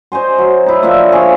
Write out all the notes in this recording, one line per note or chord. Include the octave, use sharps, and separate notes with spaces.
C5 D#5 G#5 C6
F#3
D#4 E4
F3 A#3 D4 E5
D4 G#4 C#5